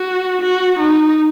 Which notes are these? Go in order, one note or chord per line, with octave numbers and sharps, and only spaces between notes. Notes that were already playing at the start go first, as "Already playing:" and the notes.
Already playing: F#4
F#4
D#4